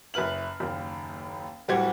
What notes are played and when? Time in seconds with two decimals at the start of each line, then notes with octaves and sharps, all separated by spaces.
0.14 F#1 E4 B4 F6 F#7
0.60 F#1 D#2
1.68 D1 G3 F#4 C5 G#6